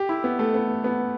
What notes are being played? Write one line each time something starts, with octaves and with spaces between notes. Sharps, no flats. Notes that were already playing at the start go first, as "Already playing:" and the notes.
Already playing: G4
E4
B3
A3
B3
B3